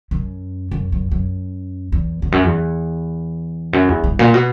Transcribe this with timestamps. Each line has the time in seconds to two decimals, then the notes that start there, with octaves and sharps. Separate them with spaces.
0.11 F#2
0.71 F#2
0.92 F#2
1.11 F#2
1.92 E2
2.22 E2
2.32 F#2
2.43 E2
3.73 F#2
3.88 E2
4.04 G2
4.19 A#2
4.34 B2